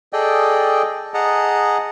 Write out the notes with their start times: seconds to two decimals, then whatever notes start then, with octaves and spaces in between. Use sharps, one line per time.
0.13 G#4 A4 D5 D#5 G5
1.14 G#4 D#5 F#5 A5 A#5